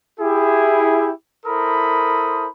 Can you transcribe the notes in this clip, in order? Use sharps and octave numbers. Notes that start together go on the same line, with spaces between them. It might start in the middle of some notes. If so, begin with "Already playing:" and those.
E4 G4 G#4
E4 A4 A#4 C5 B5 D#6